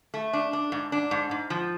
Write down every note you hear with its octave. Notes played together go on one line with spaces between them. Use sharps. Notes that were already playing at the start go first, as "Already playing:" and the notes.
A3
D4
D4
G#2
D4
G#2
G#2
F3